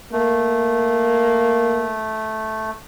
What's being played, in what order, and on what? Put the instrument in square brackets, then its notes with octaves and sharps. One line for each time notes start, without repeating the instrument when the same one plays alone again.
[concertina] A3 [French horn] A#3